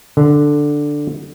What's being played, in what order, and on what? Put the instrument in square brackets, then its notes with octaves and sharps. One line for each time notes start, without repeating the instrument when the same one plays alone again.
[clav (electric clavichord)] D3